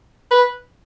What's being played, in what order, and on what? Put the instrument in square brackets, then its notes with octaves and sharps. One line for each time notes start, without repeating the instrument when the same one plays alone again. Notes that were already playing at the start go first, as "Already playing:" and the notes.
[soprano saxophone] B4